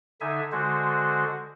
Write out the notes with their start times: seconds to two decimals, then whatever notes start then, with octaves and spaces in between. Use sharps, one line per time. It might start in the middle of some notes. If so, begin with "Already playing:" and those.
0.21 D3 D#4 E5 G#5
0.52 D3 G#3 F#4 C5